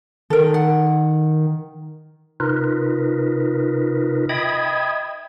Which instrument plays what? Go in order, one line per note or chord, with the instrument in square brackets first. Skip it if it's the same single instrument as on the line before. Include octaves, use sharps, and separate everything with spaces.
[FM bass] D#3 [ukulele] A4 A#4
[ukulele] F#5
[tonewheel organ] C3 D#4 F4 A#4 B4
D#5 E5 G5 B5 D#6 G#6